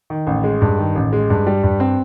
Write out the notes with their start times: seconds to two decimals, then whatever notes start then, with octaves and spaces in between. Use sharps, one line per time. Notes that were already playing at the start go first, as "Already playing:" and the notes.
0.10 D#3
0.27 A1
0.44 G#3
0.62 G2
0.78 D#3
0.95 A1
1.13 G#3
1.30 G2
1.47 G3
1.63 G2
1.80 C4